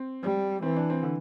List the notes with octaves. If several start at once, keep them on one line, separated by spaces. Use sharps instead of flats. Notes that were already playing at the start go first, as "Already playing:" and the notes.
Already playing: C4
G3
E3 C4
D4
C4
D3